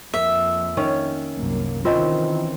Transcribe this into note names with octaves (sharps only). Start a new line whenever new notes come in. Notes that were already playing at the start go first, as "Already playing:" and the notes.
F2 A#3 E5
D#3 C#4 C#5
C2 F#2 A#3
D#3 E3 C4 C#4 F4 D#5